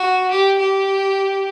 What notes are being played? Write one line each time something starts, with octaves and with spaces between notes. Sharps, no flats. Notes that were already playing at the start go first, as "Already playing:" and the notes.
Already playing: F#4
G4
G4